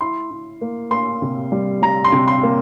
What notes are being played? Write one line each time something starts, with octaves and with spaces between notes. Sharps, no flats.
E4 C6
E4
A#3
A#3 C6
C3
G3
G3 A#5
C6
C3
C6
A#3